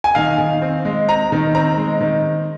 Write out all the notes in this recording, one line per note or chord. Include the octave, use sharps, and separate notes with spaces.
G#5
D#3 F5
D#3
C4
G#3
C4 A#5
D#3
C4 A#5
G#3
D#3